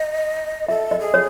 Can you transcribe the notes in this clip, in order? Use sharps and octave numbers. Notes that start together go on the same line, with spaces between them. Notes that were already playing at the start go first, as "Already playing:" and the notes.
Already playing: D#5
A4 E5
D#5
G#4
C#5